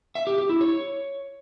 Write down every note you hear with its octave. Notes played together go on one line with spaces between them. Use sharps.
E5
G4
G4
E4
C#5